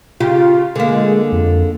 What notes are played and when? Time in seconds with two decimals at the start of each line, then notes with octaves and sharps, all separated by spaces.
0.20 C#3 F4 G4
0.76 D3 G#3 A#3
1.32 F2